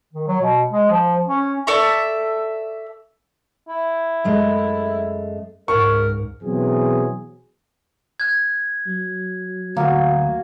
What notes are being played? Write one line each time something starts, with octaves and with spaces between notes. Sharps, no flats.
D#3
F#3
B2
G#3
F3
C#4
A4 D5 E5 C#6
E4
F#2 G#3 A3
C#2 G#2 A#4 C#6
B2 E3 F#3 C4 G#4
F#6 G#6
F#3
D2 A#3 F#4